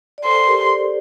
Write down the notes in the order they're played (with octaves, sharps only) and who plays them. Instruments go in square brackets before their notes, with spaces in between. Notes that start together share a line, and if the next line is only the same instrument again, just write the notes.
[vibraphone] D5
[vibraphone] A4 C5 [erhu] C6
[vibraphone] G4 A#4
A#4 D5